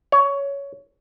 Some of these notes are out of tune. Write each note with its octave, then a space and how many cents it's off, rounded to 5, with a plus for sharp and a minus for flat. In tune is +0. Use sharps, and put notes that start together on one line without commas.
C#5 +15